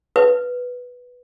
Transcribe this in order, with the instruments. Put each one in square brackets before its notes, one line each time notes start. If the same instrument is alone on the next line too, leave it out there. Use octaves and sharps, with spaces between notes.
[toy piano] B4